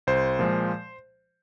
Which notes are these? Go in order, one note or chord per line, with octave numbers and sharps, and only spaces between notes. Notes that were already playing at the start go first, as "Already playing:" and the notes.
C2 C5
A#2 F3 G#3